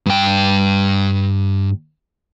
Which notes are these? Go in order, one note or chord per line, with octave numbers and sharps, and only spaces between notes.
G2 G5